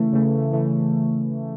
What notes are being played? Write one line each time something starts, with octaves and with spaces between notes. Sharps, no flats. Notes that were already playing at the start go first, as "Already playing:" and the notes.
Already playing: C#3 E3 A3
C#3 E3 A3
C#3 E3 A3